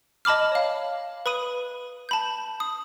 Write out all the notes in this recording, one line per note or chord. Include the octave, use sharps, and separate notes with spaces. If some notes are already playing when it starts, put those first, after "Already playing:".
D#5 A5 B5 D6 F6
C#5 F5
B4 B5 D#6 D#7
A5 B5 G6
D#6